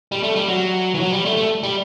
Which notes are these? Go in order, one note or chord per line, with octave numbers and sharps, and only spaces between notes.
G3
A3
G3
F#3
E3
F#3
G3
A3
A3
G3